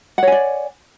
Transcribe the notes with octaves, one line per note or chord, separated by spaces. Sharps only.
C#5 D5 F#5 G#5